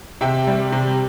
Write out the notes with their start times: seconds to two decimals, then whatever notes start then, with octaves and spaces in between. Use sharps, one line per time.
0.21 C3 E5 G5
0.47 G3
0.72 C3